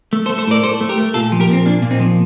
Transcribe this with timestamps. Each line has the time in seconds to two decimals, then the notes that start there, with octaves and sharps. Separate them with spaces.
0.13 A3
0.26 A4 C5
0.30 A3
0.38 A4 C5
0.47 A2 A#4 D5
0.63 A2 A4 C5
0.81 A3
0.89 G4 A#4
0.98 A3
1.14 A#2 F4 A4
1.32 F3
1.40 G4 A#4
1.49 A#2 C4
1.66 A#3 D4
1.82 A#2
1.91 C4 D#4
2.00 F3